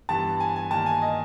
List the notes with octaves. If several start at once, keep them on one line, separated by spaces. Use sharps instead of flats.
G2 E3 G3 B3 A5
G#5
G#5
G2 D#3 G3 A#3 A5
G#5
D#5